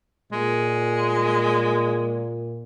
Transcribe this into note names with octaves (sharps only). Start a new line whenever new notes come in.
A#2 G#3